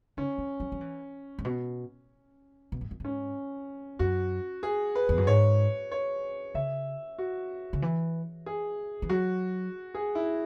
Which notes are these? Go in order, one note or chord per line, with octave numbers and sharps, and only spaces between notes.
C#3 C#4
E3
F#3
F#3
E3
G#2
B2
B2
G#2
F#2
G#2 C#4
F#2 F#4
G#4
B4
E2
F#2
G#2 C#5
C#5
C#3 E5
F#4
C#3
E3
G#4
E3
F#3 F#4
G#4
E4